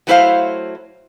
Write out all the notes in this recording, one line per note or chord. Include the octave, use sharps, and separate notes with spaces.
F#3 A3 E4 B4 C5 F5